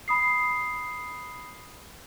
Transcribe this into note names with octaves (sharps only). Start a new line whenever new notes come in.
B5 D#6 C7